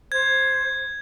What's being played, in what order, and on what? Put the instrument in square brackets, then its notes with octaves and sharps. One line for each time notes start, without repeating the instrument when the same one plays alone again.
[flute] C5 [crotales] G#6